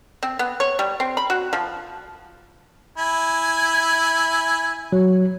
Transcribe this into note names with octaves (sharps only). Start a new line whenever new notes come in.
C4
B3
C#5
G3
C4
B5
F#4
F3
E4 G#5
F#3